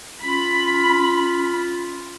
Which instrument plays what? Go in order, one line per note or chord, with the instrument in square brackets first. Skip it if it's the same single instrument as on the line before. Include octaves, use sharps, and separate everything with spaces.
[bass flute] C#4 [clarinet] F4 [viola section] B5